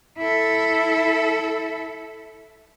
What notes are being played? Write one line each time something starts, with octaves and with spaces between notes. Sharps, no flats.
E4 A4